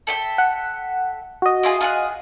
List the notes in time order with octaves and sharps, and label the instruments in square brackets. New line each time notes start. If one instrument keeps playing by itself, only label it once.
[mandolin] A4 E5 G5
[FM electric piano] F#5
F#4 D#5
[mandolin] E4 F4 G#4
F4 G#4 F#6